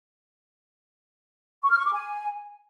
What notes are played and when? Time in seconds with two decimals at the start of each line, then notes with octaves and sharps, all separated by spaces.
1.63 C#6
1.71 F6
1.78 C#6
1.86 D6
1.93 G#5